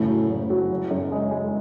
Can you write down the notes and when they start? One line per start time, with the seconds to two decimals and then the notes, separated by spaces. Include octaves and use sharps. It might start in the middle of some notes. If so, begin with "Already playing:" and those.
Already playing: F#1 A2 C#3
0.08 F#3
0.30 F#1
0.50 F#3
0.70 F#1
0.91 F#2
1.11 G#3
1.31 G#3